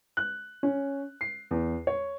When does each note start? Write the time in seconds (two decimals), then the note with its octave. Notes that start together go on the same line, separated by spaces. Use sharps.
0.17 F#6
0.63 C#4
1.21 C7
1.51 E2
1.87 C#5